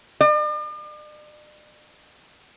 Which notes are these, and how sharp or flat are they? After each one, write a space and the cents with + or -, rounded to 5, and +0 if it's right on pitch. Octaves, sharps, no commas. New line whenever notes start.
D5 +45